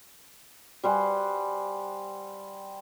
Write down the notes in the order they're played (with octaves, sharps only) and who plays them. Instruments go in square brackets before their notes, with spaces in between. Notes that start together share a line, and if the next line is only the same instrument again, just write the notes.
[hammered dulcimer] G3 C5 F#5 G#5